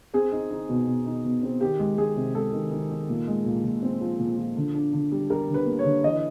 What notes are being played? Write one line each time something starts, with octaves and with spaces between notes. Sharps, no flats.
C4 G#4
D#4
D#4
B2
B2
D#4
B2
C4
D#3 G4
G#3
G#3 G#4
C3
G#3 A4
D#3
D#3
D#3
A#2
G#3
A#2
A#2
C4
F3
A#2
F3
D3
D4
D3
G3
G3 A#4
D3
B4
A#3
C#5
D3
E3 D#5